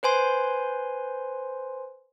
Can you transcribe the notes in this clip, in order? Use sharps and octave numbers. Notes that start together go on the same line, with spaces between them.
B4 C5 G#5 C6